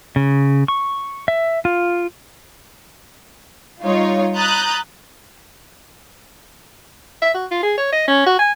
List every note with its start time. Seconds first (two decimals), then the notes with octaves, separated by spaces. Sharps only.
0.16 C#3
0.68 C#6
1.28 E5
1.65 F4
3.82 G3 D#4 F4 C#5
4.36 A#5 B5 D#6 F#6 G6 A6
7.22 E5
7.34 F#4
7.51 F4
7.63 G#4
7.78 C#5
7.93 D#5
8.08 C#4
8.26 F#4
8.39 G#5